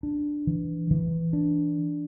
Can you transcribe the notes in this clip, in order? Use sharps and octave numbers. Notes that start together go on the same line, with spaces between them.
D4
E3
E3
D4